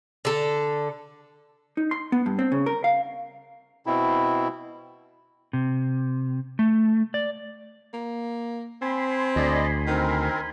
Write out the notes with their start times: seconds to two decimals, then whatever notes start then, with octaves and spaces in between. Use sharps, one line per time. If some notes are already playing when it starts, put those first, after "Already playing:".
0.25 D3 A4
1.77 D#4
1.91 C6
2.12 B3
2.26 G2
2.39 C4
2.52 C#3
2.66 A#4
2.84 F5
3.86 B2 C4 E4
5.53 C3
6.59 A3
7.14 D5
7.94 A#3
8.82 C4 G#5 B5 C6
9.36 D2 D5 D#5
9.87 D#3 C4 A#4